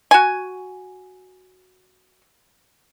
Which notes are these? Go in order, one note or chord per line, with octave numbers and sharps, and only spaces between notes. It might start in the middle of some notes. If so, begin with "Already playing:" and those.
F#4 G#5